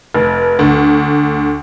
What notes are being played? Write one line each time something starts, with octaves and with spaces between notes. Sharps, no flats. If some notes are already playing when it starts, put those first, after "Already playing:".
F1
D2